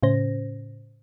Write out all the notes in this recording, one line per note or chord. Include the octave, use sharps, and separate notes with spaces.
A2 C#3 C#4 C5 A#6